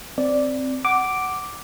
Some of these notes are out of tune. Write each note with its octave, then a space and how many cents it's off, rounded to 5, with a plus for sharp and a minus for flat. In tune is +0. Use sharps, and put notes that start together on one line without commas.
C4 +0 D5 -5
F#5 +15 D6 +0